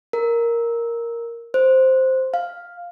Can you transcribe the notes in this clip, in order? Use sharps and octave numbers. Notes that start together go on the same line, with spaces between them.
A#4
C5
F5